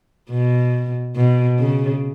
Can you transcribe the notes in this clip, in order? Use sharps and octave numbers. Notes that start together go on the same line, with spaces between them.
B2
B2
C#3